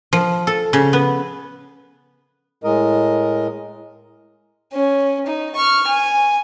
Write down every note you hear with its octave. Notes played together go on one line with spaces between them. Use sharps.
F3
A4
C#3
B3
A2 G#3 A#4 D#5
C#4
D#4
C#6 F6
G#5